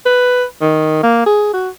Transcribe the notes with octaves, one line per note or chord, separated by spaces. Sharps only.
B4
D#3
A#3
G#4
F#4